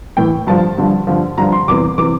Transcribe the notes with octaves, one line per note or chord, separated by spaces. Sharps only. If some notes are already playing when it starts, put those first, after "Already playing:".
A2 E3 G5
G2 D3 F3 A5
G2 D3 F3
G2 D3 F3
G2 D3 F3 A#5
C6
E2 C3 E3 D6
C3 E3 D6